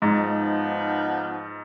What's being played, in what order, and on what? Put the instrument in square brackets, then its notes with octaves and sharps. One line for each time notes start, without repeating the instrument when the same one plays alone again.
[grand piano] G#2 [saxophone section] F3 B3 D#4